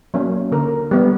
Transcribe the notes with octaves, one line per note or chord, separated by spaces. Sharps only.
F#3 A#3 C#4
D3 A#4
G3 B3